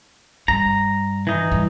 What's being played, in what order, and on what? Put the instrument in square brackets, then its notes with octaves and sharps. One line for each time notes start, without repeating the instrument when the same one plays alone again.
[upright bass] G2 [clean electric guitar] A#5
[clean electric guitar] E3 D#4
[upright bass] G2